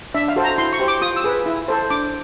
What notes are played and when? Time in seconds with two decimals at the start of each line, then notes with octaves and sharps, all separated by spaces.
0.14 D4 E5
0.28 F5
0.36 F#4 A4 C5
0.44 A#5
0.58 E4 C6
0.73 C#6
0.80 G4 C5
0.88 D6
1.02 F4 D#6
1.16 E6
1.24 G#4 B4
1.46 E4
1.68 A4 C5
1.90 D4 D6